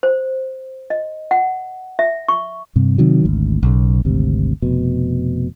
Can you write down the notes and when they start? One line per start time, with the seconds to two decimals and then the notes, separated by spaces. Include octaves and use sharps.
0.03 C5
0.90 D#5
1.31 F#5
1.99 E5
2.28 C#6
2.76 G2 C3
2.98 C3 D#3 F#3
3.25 G#1 D2
3.63 B1 C#3
4.05 G#1 D2 C3
4.62 F1 B2